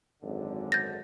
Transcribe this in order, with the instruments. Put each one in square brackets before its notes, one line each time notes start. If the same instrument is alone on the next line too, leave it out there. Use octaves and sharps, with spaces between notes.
[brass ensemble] G#1 F#2 D3
[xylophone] G6 A6 A#6